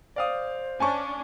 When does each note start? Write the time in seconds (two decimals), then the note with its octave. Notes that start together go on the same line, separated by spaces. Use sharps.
0.16 C5 D5 F5 D#6
0.80 C#4 D4 G#5 A5 C#6